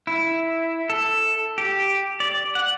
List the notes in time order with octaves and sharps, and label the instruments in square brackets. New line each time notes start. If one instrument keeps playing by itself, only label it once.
[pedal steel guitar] E4
A4
G4
D5
F#5